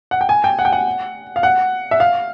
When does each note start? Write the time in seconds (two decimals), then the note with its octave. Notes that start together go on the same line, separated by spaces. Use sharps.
0.11 F#5
0.21 G5
0.29 G#5
0.44 G5
0.59 F#5
0.65 G5
0.73 F#5
1.36 F5
1.43 F#5
1.91 E5
2.00 F5